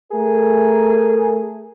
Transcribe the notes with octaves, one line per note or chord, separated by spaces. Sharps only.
A3 G#4 A#4